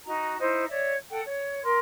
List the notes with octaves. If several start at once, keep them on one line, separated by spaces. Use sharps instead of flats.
D#4 F#4 A#5
D#4 E4 C5
C#5 D5 E5
A4 F#5 G5
C#5
A#4 C6